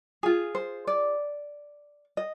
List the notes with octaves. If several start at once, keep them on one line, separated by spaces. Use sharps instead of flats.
F4 G#4 G#5
C5
D5
D#5